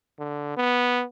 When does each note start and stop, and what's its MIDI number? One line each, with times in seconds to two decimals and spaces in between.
0.19 0.54 50
0.57 1.04 59